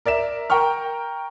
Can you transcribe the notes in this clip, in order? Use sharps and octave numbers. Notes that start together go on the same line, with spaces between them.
A#4 D5 E5 E7
A#4 G5 A#5 C#6 F6